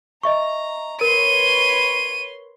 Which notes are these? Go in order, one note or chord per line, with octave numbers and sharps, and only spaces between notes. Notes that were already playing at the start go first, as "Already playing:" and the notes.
D#5 E5 A#5 C#6
A#4 B4 C#5 C6 D#7